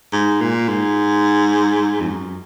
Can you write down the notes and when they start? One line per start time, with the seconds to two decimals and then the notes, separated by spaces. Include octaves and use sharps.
0.13 G#2
0.41 A#2
0.68 G#2
2.00 F2
2.08 F#2